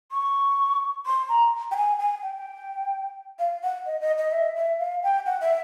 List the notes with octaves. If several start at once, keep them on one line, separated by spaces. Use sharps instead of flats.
C#6
C6
A#5
G5
G#5
G#5
G5
F5
F#5
D#5
D#5
D#5
E5
E5
F5
G5
F#5
E5